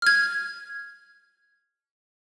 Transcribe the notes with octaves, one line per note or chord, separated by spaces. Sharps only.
F6 G#6